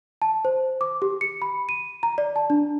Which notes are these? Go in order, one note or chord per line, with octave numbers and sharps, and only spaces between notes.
A5
C5
D6
G4
C#7
B5
D#7
A#5
D5
A5
D4